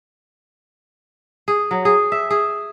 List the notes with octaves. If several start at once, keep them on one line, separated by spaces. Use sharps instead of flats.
G#4
F#3
G#4
E5
G#4